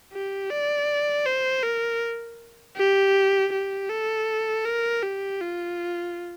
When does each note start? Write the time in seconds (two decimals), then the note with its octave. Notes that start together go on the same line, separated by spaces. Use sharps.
0.12 G4
0.51 D5
1.26 C5
1.63 A#4
2.77 G4
3.53 G4
3.90 A4
4.65 A#4
5.03 G4
5.41 F4